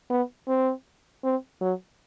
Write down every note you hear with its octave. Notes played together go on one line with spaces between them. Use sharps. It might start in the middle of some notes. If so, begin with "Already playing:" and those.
B3
C4
C4
F#3